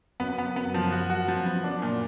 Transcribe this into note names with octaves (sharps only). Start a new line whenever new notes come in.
F#2 B3
B3
B3
F3
F#4
F#4
F3
B3
D4
A#2